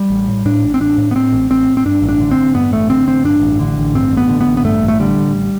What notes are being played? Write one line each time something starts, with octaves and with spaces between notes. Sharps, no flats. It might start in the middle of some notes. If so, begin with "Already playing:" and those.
Already playing: G3
A1
A2
A2 D4
A1
C4
A1 D4
A2
B3
A2 C4
A1
A1 C4
A2
C4
G2 D4
A1
D4
D3
C4
A1
G2 B3
A1 A3
D3 C4
A1 C4
G2 D4
A1
D3
A1
G2 C4
A1
B3
D3
B3
A1
B3
G2 A3
A1
A3
D3 G3
A1